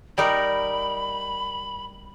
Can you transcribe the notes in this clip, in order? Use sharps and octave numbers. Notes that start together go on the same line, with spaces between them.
G3 D#4 A#4 B5